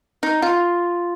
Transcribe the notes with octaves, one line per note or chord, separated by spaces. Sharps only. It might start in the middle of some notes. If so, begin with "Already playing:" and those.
D#4
F4